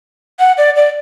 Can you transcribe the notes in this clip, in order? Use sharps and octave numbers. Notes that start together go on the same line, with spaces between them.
F#5
D5
D5